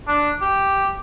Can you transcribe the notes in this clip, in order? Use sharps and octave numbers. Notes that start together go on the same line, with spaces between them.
D4
G4